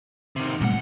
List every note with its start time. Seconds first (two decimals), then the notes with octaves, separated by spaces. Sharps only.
0.36 C3 D#3
0.61 F#2 A#2 G3 A3 F#5